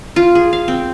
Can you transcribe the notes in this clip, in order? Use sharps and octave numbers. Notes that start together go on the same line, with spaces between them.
F4
G#4
F5
C4